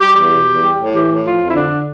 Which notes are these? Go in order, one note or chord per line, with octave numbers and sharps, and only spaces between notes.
G3 G4
E2 G4
B2
E2
G3
A2
E3 G4
A2
F3 F4
F2
E4
D3 D4